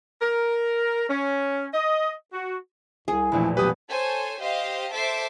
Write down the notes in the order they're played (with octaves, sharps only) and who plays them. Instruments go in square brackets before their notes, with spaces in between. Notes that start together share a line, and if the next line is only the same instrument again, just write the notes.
[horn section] A#4
C#4
D#5
F#4
[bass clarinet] C2 [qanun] G#4
[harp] E1 A#1 A3 [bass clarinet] E4
[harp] F#3 B3 [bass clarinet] G4 [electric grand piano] B4 D#6
[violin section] A4 C5 C#5 G#5
G4 C5 D#5 F5
A4 C5 E5 D6 C7